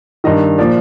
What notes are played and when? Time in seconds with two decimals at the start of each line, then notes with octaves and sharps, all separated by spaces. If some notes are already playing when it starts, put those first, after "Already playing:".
0.24 G2 D#3 D#5
0.58 A#2 F3 D5